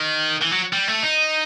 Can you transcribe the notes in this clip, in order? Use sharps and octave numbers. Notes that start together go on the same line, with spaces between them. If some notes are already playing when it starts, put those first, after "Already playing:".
Already playing: D#3
E3
F#3
G3
A3
D#4